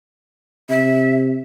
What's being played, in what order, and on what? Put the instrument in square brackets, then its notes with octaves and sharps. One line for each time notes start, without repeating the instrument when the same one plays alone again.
[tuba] C3 [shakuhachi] E5